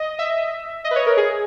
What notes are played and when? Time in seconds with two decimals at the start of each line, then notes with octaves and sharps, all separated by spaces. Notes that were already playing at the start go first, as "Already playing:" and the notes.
Already playing: D#5
0.19 E5
0.84 D#5
0.91 B4
0.96 C#5
1.06 A#4
1.17 G#4